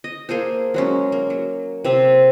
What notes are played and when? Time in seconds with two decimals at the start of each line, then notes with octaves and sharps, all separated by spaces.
0.04 D#5
0.29 A#3 G#4 A4 C5
0.74 F#3 G#3 C#4
1.12 A#3
1.30 F#3
1.84 C3 C4 E5